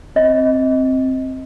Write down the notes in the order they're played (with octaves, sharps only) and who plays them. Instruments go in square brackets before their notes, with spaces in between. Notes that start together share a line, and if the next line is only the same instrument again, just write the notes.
[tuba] C4 [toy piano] D#5